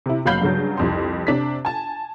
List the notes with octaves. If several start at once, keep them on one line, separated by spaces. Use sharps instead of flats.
C3 E4
F#1 F#3 F5 B5 G6 C7
G2 C#3 F#3
C2 F2 C6
C3 D4 B6
G#5 A5